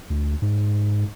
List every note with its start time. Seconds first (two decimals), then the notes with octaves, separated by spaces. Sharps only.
0.10 D2
0.42 G#2